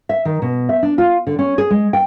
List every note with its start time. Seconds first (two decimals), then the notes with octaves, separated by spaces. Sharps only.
0.09 E5
0.25 D#3
0.42 B2
0.69 E5
0.83 D4
0.98 F4
1.27 D3
1.39 C#4
1.58 G#4
1.70 G#3
1.93 G5